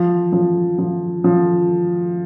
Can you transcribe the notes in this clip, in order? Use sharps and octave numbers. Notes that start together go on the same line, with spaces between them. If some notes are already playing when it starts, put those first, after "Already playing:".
Already playing: F3
F3
F3
F3